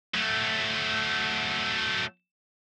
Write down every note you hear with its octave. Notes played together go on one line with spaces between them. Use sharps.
F#3 A3